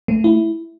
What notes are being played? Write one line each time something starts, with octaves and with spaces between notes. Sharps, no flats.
A3
E4